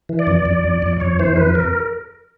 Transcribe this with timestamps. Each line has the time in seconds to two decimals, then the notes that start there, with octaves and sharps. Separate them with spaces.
0.09 E3
0.19 D5
0.27 F2
0.45 F2
0.64 F2
0.82 F2
1.00 F2 C#5
1.19 E3 C5
1.37 F2 B4
1.55 A#4